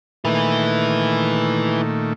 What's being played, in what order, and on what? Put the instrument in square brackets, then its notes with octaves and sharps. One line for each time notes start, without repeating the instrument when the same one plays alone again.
[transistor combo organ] A#2 D#3 A3 [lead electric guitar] E4 B4